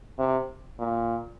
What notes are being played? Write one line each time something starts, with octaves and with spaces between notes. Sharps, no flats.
C3
A#2